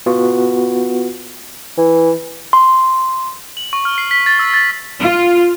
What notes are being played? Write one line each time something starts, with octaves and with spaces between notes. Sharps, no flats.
B3 F4 F#4
E3
C6
F#7
C#6
F6
C7
B6
A6
E6
A6
F4